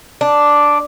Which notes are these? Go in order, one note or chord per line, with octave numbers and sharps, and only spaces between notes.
D4